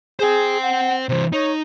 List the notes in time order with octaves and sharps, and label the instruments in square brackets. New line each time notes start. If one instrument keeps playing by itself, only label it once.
[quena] G#4 [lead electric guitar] C5 G5
[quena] F#5
[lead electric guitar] C3 E3 [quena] C5
[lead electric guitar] D#4 [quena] C#5